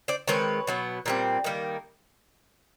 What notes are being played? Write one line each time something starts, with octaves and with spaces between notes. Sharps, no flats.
C5 D5
D#3 G#3 C4 B4 C#5
B2 F#3 B3
A#2 G3 C4
D#3 G3 A#3